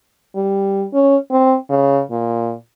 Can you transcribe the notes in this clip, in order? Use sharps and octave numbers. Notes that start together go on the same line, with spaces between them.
G3
C#4
C4
C#3
A#2